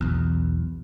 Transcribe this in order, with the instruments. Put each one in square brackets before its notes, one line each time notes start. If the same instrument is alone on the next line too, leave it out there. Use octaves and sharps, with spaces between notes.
[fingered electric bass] B1 E2